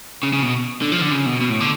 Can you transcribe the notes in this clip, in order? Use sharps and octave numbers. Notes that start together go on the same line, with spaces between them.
C#3
C#3
B2
D3
F3
D3
C#3
B2
B2
A2
D3